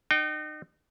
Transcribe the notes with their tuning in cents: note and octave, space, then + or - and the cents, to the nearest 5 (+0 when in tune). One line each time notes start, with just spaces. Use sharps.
D#4 -35 G5 -30